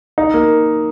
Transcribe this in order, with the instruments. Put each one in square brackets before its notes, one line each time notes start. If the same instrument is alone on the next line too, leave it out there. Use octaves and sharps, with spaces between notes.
[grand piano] D#4
A#3